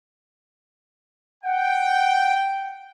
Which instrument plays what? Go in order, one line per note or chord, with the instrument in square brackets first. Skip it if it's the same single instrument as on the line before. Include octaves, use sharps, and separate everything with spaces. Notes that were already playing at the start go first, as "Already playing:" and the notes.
[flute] F#5 [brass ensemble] G5